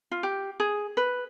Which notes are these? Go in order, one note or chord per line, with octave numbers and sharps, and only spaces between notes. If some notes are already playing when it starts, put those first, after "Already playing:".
F4
G4
G#4
B4